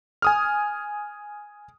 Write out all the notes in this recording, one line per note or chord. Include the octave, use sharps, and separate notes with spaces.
G#5 D#6 F6